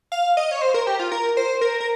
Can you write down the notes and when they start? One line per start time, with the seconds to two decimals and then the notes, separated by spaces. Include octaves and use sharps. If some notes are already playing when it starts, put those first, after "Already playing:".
0.12 F5
0.37 D#5
0.51 C#5
0.61 C5
0.74 A#4
0.87 G4
0.99 F4
1.12 A#4
1.37 C5
1.61 A#4
1.80 A#4